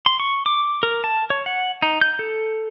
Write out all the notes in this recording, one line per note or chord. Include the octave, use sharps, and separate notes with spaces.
C6
C#6
D6
A#4
A5
C#5
F#5
D#4
G6
A4